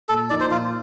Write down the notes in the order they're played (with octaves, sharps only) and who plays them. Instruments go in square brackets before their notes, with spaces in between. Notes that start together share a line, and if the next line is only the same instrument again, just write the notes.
[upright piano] A#2 [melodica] A4
[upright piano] F3 A#3 D#4 [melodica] D5
[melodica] C5
[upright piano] A#2 [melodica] F4